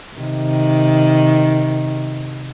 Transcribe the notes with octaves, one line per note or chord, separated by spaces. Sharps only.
C3 D#3